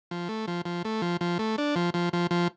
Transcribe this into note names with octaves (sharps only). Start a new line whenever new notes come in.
F3
A3
F3
F3
A3
F3
F3
A3
D4
F3
F3
F3
F3